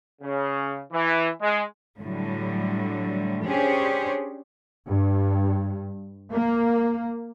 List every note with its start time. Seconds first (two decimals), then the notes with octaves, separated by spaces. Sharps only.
0.22 C#3
0.92 E3
1.42 G#3
1.98 A2 D3 F#3 G3
3.44 C#4 D4 G4 G#4 C5 C#5
4.88 G2
6.32 A#3